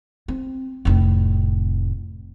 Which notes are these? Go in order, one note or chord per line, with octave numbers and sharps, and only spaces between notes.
C4
F1 A2